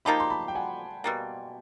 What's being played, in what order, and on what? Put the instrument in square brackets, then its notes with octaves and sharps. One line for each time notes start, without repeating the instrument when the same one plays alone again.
[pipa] F3 A#3 D#4 G4 [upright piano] A5 B5
[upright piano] C6
A5 B5
G5
F#5 G#5
[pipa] B2 G3 A#3